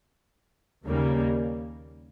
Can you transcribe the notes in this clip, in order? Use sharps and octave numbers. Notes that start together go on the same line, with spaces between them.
D#2 C#3 G3 A#3